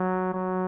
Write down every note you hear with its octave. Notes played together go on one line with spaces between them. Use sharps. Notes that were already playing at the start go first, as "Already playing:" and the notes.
Already playing: F#3
F#3